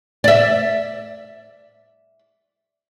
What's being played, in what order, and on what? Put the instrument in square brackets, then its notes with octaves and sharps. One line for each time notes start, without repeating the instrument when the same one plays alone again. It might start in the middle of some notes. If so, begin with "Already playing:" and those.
[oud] D5 E5